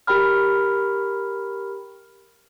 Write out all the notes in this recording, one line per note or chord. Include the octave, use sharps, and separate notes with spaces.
G4 A#4 G5 B5 F6